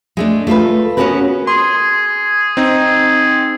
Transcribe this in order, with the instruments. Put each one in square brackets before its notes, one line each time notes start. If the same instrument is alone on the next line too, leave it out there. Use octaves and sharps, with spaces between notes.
[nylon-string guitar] G#3 A3 D4
A3 F4 A4 B4
B3 C#4 F#4 G#4 A#4 B4
[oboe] G#4 [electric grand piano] C6
[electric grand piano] C4 D#4